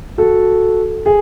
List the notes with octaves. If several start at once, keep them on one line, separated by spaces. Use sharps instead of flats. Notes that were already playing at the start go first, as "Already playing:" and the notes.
F#4 A4
G#4